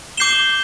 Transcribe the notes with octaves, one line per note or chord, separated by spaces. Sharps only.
D6 G6 C7 E7 G7